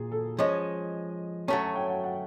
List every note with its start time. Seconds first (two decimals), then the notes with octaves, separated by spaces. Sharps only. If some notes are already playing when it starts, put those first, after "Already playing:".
Already playing: A#2 G#4
0.12 A4
0.39 F3 G#3 C#4 D#5
1.48 F#3 A3 C#4 A5
1.63 A5
1.75 G5
1.89 F#5
2.04 F#5